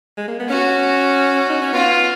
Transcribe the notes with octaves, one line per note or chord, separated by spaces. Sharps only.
G#3
A#3
B3
C#4 F#4
D#4
C#4
B3 F4